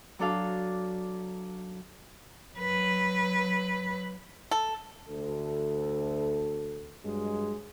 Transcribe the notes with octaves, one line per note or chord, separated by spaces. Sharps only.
F#3 D4 A4 F5
F#3 B4
A4
D2 A4
G2 F#3 G#3